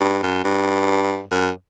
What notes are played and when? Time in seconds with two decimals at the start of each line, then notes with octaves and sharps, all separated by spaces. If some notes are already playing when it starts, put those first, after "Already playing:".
0.01 G2
0.23 F#2
0.44 G2
1.31 F#2